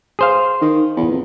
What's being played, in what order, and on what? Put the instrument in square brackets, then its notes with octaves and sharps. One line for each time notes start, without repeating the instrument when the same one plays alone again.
[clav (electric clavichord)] G#4 C5 F5
[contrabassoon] D#3
E2
F2